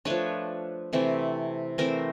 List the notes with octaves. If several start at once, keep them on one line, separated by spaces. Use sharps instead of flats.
F3 A3 D4 B4 C#5
C3 E3 A3 C4
E3 A3 C4 A#4 C5